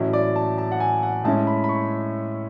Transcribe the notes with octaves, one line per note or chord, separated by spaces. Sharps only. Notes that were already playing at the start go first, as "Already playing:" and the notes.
Already playing: A1 A2 F#3 C#4 E4
D5
A5
A5
F#5
G#5
F#5
A2 G#3 C#4 E4 A5
B5
B5
C#6